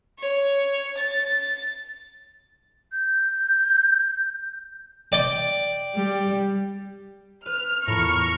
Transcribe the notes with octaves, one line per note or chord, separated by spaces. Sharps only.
C#5
A6
G6
D5 G5
G3
B4 F6
E2 A2 F4 A#4 B5 C#6